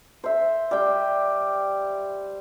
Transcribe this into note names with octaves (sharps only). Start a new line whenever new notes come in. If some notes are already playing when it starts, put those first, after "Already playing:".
C5 E5
G3 G5